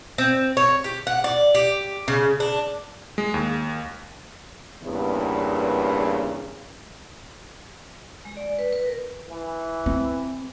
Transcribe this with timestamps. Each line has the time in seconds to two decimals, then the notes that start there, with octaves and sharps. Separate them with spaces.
0.18 C4
0.57 C#5
0.84 G4
1.07 F#5
1.24 D5
1.55 G4
2.08 C#3
2.40 D4
3.18 G#3
3.34 D#2
4.83 E2 G2 A#2 C#3 B3
8.25 G#3
8.37 D5
8.59 B4
8.73 B4
8.86 A#4
9.29 E3
9.86 C4